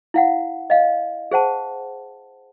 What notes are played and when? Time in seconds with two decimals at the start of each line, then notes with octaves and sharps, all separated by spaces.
0.14 E4 F5 F#5
0.70 D#5 F5
1.31 G#4 C5 F#5 A5